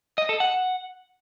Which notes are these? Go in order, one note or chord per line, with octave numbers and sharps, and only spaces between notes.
D#5
A4
F#5